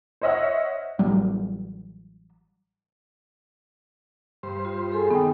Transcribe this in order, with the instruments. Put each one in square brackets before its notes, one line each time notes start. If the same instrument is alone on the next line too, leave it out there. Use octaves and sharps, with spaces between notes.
[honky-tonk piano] C5 C#5 D#5 E5 F#5 F6
[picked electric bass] A1 F#3 G3
[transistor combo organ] G2 C5
[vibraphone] F4
G#4 A4 G#5
[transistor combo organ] D#3 [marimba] B3 G5